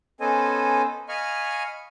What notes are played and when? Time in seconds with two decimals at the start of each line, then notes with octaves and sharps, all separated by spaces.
0.21 B3 C#4 A4 C5 D#5 G#5
1.09 D#5 F5 G#5 B5 C#6 F6